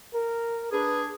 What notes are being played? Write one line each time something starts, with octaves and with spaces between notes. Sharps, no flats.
A#4
D4 G#4 B4